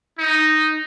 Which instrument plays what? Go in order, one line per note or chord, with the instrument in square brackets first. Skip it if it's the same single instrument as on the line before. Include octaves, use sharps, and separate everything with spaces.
[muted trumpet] D#4